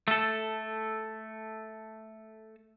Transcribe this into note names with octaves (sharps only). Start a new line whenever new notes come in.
A3 A4